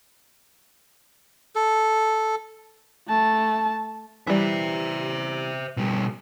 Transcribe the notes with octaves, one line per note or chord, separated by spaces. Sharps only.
A4
A3 A5
E3 G3 C5 E5
B2 G3